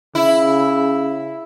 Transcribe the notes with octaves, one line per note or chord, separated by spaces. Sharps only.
C#3 E4